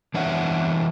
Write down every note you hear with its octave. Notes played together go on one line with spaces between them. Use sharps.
E3 D4 C#5 E5 F#5